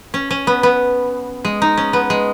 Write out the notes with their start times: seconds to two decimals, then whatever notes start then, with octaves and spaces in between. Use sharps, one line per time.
0.14 C#4
0.31 C#4
0.47 B3
0.63 B3
1.45 G#3
1.62 D#4
1.77 C#4
1.93 B3
2.10 G#3